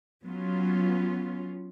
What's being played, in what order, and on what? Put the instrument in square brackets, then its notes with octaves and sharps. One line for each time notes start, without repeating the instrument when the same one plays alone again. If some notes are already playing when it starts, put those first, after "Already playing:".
[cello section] F#3 B3 C#4 F4